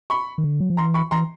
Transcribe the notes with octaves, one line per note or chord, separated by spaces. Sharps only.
B5 C#6
D#3
D3
F#3
F3
E3 A#5 C6
B5 C#6
E3 A#5 C6